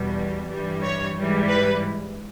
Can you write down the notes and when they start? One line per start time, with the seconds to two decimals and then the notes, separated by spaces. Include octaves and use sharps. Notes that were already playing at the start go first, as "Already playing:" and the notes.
Already playing: E2 B2 G3
0.50 G2 E3 G3
0.83 C#5
1.16 G#2 E3 G3
1.48 B4